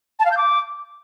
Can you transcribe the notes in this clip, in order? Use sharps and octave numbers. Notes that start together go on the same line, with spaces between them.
A5
F5
G6
D6